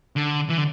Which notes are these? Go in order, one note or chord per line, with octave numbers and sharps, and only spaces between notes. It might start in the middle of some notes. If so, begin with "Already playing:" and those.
D3
E3
D3